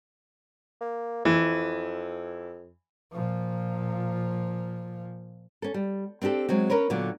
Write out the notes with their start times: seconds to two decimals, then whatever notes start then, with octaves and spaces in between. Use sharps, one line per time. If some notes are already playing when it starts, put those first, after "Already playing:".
0.81 A#3
1.25 F2 E3
3.12 A#2 F3
5.62 C#4 A4
5.74 G3
6.22 C4 D4 F#4 G4 A4
6.49 F#3 G#3 C4
6.70 C#4 A#4 B4 C#5
6.90 A#2 D3 F#3 B3